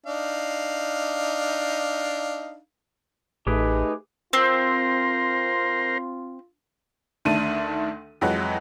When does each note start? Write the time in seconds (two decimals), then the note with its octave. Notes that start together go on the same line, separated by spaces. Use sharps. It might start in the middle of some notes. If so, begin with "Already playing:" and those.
0.06 D4 D#4 F5
3.47 A1 A3 D#4 G4 G#4 B4
4.33 C4 F4 A#4 C5
7.25 D2 D#3 A3 D4 D#7
8.21 F2 E3 F#3 G#3 F#4 F#6